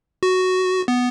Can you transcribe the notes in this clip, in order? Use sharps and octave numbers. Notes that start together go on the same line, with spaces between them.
F#4
B3